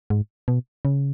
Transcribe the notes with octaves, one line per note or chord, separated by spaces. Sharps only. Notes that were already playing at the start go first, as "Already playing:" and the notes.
G#2
B2
C#3